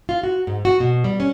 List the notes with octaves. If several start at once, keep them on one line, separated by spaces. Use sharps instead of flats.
F4
F#4
G#2
F#4
B2
G3
C#4